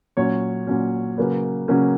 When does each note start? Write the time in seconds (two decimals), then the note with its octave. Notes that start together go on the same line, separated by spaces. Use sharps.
0.17 A#2 F#3 C#4 C#5
0.67 A#2 F#3 C#4
1.18 C#3 F#3 A#3 C#4 B4
1.68 C#3 F#3 A#3 C#4